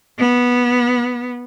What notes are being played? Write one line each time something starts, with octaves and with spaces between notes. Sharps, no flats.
B3